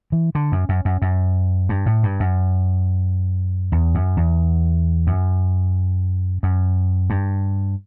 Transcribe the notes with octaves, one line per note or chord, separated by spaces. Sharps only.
E3
D3
F#2
F#2
F#2
F#2
G2
A2
G2
F#2
E2
F#2
E2
F#2
F#2
G2